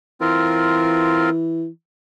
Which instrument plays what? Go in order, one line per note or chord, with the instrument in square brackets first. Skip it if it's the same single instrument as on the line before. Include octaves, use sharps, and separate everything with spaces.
[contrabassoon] E3 [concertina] C4 F4 A#4